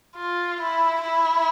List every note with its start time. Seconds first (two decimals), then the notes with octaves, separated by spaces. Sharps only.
0.16 F4
0.60 E4
1.01 E4